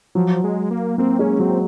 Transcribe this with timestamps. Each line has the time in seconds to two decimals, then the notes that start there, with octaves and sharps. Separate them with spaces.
0.15 F3 F#3
0.44 G#3
0.71 A#3
0.98 A#3 C4
1.19 G#3 C#4
1.39 F#3 C4